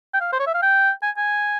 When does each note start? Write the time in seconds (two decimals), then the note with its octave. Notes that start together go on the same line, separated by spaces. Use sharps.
0.14 G5
0.21 F5
0.33 C5
0.40 C#5
0.47 E5
0.54 F5
0.62 G5
1.02 G#5
1.17 G#5